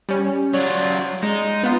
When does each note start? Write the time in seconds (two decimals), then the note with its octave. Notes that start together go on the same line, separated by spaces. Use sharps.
0.09 G3 C#4
0.54 F#3 F4 C#5 D5
1.23 G#3 D#4
1.64 B3 F4